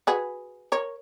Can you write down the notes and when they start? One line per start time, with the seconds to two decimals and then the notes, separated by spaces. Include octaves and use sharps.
0.07 F#4 G#4 B4
0.72 A#4 C#5